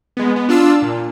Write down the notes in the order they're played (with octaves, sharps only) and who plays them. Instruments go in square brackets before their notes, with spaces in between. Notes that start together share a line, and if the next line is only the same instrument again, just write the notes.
[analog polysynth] G#3 B3
B3
D4 F4 A5 E6
A#2